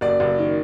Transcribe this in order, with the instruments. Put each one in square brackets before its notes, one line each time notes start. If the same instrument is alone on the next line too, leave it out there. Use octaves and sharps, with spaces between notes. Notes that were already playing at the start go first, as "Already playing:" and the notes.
[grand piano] F#1 D5
F#1
D#3